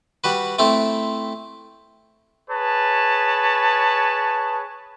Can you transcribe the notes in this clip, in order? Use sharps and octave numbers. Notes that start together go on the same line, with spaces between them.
G3 F#4 B4
A3 C4 E4
G#4 B4 C#5 A5